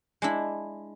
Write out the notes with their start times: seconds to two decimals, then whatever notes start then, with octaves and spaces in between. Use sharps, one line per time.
0.22 G#3 D4 E4